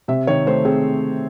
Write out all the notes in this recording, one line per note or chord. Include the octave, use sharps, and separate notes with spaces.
C3 E5
D#3 C#5
A3 C5
C4 G#4